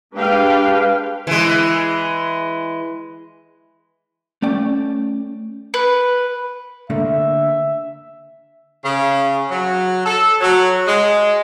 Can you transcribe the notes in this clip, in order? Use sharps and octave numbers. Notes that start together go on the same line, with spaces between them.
G#3 D4 G4 B4 F5 G5
E3 G#3
A3 C#4 D5 G5
B4
D3 A3 A#3 E5
C#3
F#3
A4
F#3
G#3